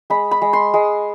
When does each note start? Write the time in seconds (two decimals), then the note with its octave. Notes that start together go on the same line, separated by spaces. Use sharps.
0.10 G#3 B5
0.31 B5
0.42 G#3
0.53 C6
0.74 G#3